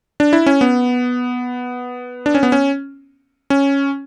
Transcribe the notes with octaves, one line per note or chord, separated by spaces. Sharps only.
D4
E4
C#4
B3
D4
C#4
B3
C#4
C#4